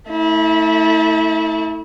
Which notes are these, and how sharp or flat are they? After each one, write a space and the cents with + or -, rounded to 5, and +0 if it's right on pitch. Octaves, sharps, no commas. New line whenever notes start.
A3 +10 E4 -30